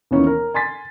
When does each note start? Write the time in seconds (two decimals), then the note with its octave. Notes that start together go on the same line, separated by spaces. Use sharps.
0.11 D#2 E3 B3 C#4 D#4
0.27 A#4
0.54 G#5 C6 A6 B6